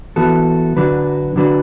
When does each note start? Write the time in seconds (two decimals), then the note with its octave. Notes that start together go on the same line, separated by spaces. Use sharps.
0.16 E3 B3 F#4 A4
0.77 D3 F#3 D4 F#4 B4
1.36 D3 F#3 D4 F#4 B4